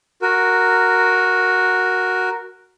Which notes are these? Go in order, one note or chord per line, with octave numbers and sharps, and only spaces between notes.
F#4 A#4